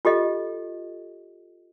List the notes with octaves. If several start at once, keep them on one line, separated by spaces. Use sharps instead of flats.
F4 G4 A4 D#5